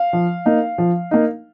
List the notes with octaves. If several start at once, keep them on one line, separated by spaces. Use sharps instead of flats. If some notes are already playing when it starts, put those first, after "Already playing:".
Already playing: F5
F3
A#3 D#4
F3
A#3 D#4